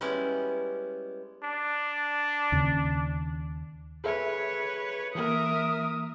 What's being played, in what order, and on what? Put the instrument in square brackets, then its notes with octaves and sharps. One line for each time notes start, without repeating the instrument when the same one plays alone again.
[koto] G3 G#3 B3 C#4 E4
[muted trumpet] D4
[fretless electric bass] D#2 C#3
[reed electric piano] G#4 A4 E5 [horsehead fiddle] B4 C#5
[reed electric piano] E3 A#3 [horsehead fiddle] A#4 E5 [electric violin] D#6